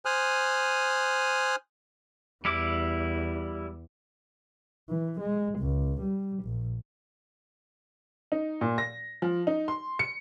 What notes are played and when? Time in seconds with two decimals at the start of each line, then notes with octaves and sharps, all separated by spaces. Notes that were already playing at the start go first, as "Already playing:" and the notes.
0.05 C5 G#5 D#6 F6 F#6
2.45 E2 G3 E4 D6
4.89 E3
5.20 G#3
5.59 C#2
6.01 G3
6.44 A#1
8.32 D#4
8.61 A#2
8.78 A#6
9.22 F3
9.47 D#4
9.68 C6
9.99 C#7